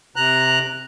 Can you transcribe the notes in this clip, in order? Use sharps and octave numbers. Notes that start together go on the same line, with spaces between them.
C3 A#5 F#6